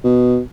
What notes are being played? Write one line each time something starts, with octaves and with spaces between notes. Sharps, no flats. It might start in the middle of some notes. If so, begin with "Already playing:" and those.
B2